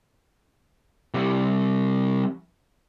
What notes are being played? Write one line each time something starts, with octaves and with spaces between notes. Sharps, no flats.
C3 G3